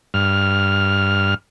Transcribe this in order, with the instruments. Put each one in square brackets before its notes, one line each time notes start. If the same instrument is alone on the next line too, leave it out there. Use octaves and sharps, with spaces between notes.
[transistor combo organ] G2 F6